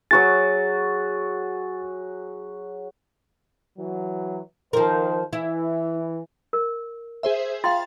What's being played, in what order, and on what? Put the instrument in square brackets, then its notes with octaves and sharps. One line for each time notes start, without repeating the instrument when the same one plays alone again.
[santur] F#3 F#4 G#4 [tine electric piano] A6
[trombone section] E3 F#3
[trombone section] D#3 C5 [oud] F3 A#4
[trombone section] E3 [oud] E4
[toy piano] A#4
[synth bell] G#4 C5 E5
[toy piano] F4 G5 C6 [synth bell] F5 A6